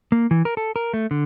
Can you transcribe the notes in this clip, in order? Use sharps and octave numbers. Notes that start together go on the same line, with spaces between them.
A#3
E3
A#4
A4
A#4
A3
D3